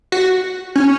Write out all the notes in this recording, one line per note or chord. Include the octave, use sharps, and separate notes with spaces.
F#4
C#4